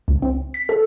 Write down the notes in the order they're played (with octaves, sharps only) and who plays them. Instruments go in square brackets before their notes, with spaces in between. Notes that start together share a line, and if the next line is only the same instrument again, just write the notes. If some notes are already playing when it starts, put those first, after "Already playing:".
[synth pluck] C#2
C4
B6
A4